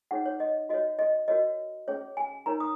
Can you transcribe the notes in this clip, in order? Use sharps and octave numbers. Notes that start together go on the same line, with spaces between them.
D#4 G#4 C#5 F#5
C#5
D#5
F#4 C#5 D#5
D#5
F#4 A#4 C#5 D#5
C#4 G#4 C#5
G#5
D#4 A#4 C#5 A#5
D#6